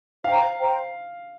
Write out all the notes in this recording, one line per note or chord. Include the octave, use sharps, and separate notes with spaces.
C5 F5 G5 A#5
C5 G5 A#5